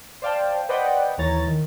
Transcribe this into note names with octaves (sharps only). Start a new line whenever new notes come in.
C5 D5 F5 G5 A5
B4 C5 D5 D#5 F#5 G5
D#2 E3 C#5 A#5 A6
D#3